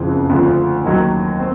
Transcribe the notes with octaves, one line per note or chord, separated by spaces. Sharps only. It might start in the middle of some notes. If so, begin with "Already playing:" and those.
Already playing: F#1 F2 C#3 E3 C4
D2 D3 F3
D#2 D#3 F#3
C4